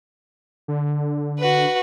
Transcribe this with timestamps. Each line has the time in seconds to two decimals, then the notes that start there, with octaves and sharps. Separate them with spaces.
0.68 D3
1.39 F#4 B4